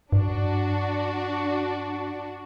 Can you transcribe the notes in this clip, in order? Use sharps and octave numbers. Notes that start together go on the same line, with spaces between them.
G2 D4 F#4